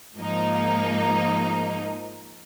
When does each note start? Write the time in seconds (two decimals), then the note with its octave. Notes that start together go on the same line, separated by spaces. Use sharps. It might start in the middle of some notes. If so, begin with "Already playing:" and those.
0.17 G#2 F3 A#3 D#4